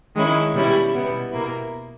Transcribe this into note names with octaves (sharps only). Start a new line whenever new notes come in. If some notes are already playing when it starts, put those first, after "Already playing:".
D#3 G#3 C#4 E4
B2 G3 C#4 E4
B2 G3 B3 E4
B2 A#3 E4